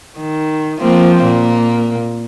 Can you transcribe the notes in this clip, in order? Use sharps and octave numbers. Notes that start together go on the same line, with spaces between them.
D#3
F3 A#3 C4
A#2 A#3